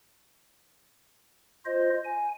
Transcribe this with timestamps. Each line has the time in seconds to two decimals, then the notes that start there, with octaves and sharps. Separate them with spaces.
1.65 F4 C5 D#5
2.05 G#5